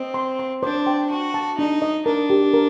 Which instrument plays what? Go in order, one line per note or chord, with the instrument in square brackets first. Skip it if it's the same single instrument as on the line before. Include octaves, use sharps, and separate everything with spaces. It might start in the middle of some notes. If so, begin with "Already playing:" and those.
Already playing: [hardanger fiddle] C4 [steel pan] D#5
[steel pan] C6
C6
[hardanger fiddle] D4 [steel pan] C5
[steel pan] G5
[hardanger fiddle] F#4 [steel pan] A5
[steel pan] A5
[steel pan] D4 [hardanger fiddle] D#4
[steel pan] D#5
[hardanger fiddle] D4 [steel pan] A#4
[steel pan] G4
A#4